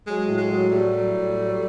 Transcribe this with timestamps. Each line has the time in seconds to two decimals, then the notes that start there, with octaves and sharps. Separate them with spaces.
0.06 F#3 G#3
0.28 A2
0.38 G#3
0.49 F#3
0.71 A2 G3 A3
0.93 F#3
1.14 A2
1.37 F#3